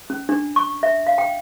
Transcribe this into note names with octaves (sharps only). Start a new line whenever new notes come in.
C#4
D4
C#6
E5
F5
G5